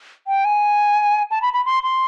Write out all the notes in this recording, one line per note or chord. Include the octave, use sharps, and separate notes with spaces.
G5
G#5
A5
B5
B5
C6
C6